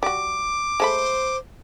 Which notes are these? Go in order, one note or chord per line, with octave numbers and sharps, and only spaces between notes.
G3 F#4 D6
G#3 A3 C5 B5